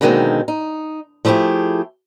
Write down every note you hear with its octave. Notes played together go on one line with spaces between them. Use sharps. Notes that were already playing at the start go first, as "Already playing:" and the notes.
B2 D3 D#3 G#3 A#3 C4
D#4
F3 A3 E4 F4 G4 G#4